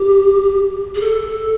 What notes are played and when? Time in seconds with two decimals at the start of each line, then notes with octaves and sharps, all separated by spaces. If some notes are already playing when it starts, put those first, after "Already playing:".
Already playing: G4
0.95 G#4
1.00 A4